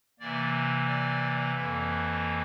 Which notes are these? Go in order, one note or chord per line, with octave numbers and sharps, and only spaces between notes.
C3 E3 A#3 D5
D5
F2 E3 A#3